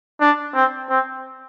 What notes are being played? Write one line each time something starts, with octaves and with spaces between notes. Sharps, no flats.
D4
C4
C4